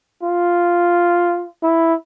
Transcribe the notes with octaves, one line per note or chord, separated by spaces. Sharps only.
F4
E4